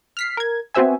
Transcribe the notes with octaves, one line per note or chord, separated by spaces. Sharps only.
F6 B6 C7
A#4 G#6
B3 C4 F#4 C5 E5 G#5